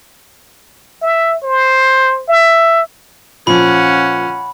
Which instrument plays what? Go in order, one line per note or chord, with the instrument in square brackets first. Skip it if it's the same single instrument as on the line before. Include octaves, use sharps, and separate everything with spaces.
[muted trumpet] E5
C5
E5
[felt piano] A#2 F3 [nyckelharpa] C#4 F#5 [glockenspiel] B5